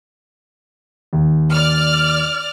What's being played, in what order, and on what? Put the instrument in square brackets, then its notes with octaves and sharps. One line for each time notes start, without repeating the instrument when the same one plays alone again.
[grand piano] D#2
[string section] D5 F6